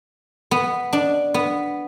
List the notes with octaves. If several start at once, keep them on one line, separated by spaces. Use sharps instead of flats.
B3
D4
B3